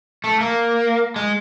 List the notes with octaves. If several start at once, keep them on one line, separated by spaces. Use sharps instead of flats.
A3
A#3
G#3